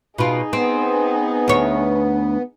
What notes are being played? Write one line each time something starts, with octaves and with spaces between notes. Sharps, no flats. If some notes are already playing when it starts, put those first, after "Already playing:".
B2 D#4 F4 G#4
B3 C4
D2 C#5